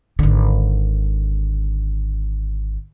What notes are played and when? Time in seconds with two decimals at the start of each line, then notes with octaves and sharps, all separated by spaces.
0.19 G#1 D3